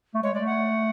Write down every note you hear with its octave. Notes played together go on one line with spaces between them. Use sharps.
A3
G#3 C#5
G#3 D5
A3
F#5